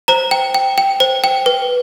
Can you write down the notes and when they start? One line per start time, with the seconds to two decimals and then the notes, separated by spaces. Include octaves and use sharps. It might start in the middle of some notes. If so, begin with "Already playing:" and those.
0.08 C5 A#5
0.31 G5
0.54 G5
0.78 G5
1.00 C5
1.24 G5
1.46 B4